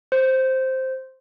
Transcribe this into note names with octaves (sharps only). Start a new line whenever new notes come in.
C5